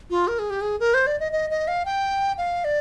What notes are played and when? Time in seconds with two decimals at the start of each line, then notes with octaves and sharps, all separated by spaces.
0.10 F4
0.28 A#4
0.39 G#4
0.50 G4
0.61 G#4
0.80 A#4
0.94 C5
1.07 D5
1.20 D#5
1.32 D#5
1.50 D#5
1.68 F5
1.85 G5
2.38 F5
2.64 D5